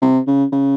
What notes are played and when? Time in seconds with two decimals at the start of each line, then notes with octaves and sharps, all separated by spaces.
0.02 C3
0.27 C#3
0.52 C#3